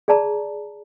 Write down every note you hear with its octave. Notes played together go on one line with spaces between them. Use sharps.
G#4 D5 A5 A#5